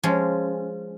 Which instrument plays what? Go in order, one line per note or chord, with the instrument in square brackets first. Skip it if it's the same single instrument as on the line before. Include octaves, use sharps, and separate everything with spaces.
[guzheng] F3 G#3 C#4